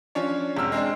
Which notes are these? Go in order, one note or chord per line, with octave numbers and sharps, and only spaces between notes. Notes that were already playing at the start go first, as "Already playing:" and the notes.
F3 C#4 D4 C#5
E1 G#2 C4 E6 F6
G#3 C4 D4